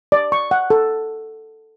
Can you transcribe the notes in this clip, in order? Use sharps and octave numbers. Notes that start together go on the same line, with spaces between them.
D5
C#6
F#5
A4